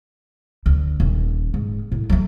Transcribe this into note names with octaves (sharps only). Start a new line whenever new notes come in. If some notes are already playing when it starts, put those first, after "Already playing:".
D2
D#1
G#2
A2
F#3 A3